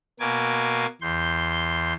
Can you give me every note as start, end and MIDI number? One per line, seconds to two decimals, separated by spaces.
0.20 0.86 47
0.20 0.86 58
0.20 0.86 80
0.20 0.86 86
1.01 1.93 40
1.01 1.93 84
1.01 1.93 91